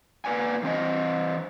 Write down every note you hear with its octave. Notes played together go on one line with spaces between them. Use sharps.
A#3 B4 D5 G#5
E3 C4 C5 D#5